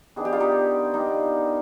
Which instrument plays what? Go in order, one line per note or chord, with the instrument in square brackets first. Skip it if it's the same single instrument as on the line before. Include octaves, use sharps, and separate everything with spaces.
[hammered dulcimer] D#3 B3 D4 [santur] G#4
[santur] G4
F4
D#4 G4
[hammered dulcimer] D#3 B3 D4 [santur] D#4